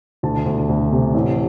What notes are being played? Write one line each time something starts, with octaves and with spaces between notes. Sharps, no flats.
D2 A5
D2
D2
C3
A1